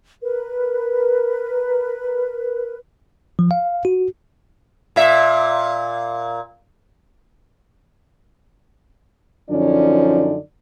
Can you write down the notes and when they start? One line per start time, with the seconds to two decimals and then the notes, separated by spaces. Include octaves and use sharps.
0.21 A#4 B4
3.39 F3
3.51 F5
3.85 F#4
4.96 A#2 E5
9.50 F#2 D3 F3 C#4 D#4 D5